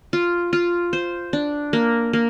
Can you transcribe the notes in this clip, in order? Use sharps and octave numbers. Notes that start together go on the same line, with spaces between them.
F4
F4
C5
D4
A#3
A#3